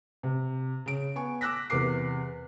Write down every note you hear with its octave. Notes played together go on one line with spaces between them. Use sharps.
C3
C#3 D7
B3 G#5 C#6
D6 E6 F#6 A#6 B6
E2 C3 A#4 D6 C7